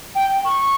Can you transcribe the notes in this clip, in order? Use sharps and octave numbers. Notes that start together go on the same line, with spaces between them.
G5
C#6